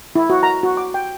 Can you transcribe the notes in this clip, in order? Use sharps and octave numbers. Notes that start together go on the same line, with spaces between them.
E4
F#4
A#5
F#4
D6
G5